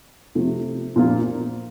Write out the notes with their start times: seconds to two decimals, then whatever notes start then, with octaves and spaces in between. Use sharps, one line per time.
0.35 C3 F3 A3
0.96 A#2 F3 A#3 D4 F4